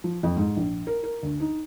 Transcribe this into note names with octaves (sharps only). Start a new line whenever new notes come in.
F3
F2
G#2
A#1
A#4
A#4
D2
D#4